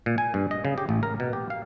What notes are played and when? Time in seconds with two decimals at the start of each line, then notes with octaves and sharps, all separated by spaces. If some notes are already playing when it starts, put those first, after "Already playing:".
0.06 A#2
0.18 G#5
0.34 G2
0.51 D#5
0.65 C#3
0.78 G4
0.89 A1
1.03 A#4
1.20 B2
1.33 G4
1.50 F5